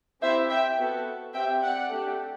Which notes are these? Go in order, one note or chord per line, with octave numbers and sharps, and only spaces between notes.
C4 E4 G4 C5 E5
E5 G5
B3 F#4 A4
C4 G4 E5 G5
D5 F#5
A3 D4 G4